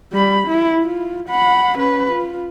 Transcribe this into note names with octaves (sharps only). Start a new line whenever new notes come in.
G3 B5
E4
F4
F#5 B5
C#4 B4
F4